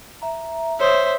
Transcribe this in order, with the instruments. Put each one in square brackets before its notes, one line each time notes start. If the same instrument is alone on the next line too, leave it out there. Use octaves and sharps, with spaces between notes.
[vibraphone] E5 A#5
[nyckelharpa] C5 E5 [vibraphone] C#5 D#6